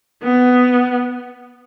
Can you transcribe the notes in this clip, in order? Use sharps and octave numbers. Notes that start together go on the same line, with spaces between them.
B3